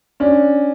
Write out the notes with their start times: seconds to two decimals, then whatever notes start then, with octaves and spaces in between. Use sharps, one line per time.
0.20 C#4 D4